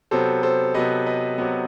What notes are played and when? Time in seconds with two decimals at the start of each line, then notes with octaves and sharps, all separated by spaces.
0.11 C3 F#3 B3 A4 C5
0.43 A4 C5
0.74 C3 F#3 B3 B4 D#5
1.06 B4 D#5
1.38 C3 F#3 B3